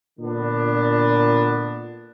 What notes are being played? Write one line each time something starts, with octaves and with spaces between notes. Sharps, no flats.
A#2 D3 B3 D4